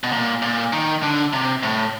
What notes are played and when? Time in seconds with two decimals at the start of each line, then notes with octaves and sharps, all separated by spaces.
0.03 B2
0.12 A#2
0.42 A#2
0.73 D#3
1.03 D3
1.33 C3
1.63 A2